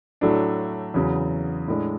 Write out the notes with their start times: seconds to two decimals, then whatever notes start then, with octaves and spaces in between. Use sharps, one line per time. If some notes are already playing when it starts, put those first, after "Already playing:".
0.21 A2 F#3 A3 D4
0.94 E2 C#3 F#3
1.68 A2 G#3 D4